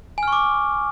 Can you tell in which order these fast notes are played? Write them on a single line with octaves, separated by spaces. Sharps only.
G#5 F6 C#6 D6